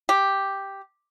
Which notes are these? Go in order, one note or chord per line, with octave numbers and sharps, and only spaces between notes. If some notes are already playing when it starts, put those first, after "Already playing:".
G4